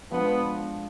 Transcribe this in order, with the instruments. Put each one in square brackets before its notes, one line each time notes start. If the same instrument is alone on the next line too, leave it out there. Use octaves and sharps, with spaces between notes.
[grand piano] F3 G#3 D4 [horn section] B3